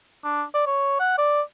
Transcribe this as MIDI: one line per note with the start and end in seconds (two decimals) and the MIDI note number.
0.24 0.44 62
0.54 0.65 74
0.66 0.98 73
1.00 1.14 78
1.18 1.41 74